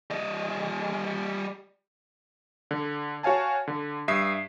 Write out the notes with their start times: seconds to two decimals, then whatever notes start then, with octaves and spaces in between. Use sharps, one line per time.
0.10 G3 D#5
2.71 D3
3.23 F#4 C#5 F5 G#5 A5
3.67 D3
4.08 G2 E5 D#6 B6 C7